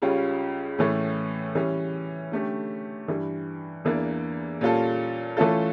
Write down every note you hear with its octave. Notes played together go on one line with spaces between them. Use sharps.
C#2 C#3 G3 C#4 F4
A2 E3 A3 C#4
E3 G3 C#4
D3 A3 C#4 G4
G2 E3 G3
E2 E3 A#3 D4
A#2 G3 C#4 F4 A4
E3 A3 C#4 F4 A4